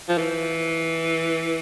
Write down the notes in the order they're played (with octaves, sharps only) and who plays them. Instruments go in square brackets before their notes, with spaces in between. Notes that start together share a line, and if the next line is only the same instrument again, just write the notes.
[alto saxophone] F3
E3